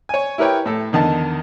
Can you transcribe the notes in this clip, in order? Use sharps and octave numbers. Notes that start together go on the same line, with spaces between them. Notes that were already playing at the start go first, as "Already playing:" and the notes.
C#5 G#5
E4 G4 A#4 B4 C#5 G5
A2 A4
E2 D3 D#3 D#4 A5